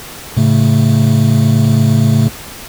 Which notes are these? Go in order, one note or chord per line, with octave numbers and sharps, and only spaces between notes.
A2 C#3 A3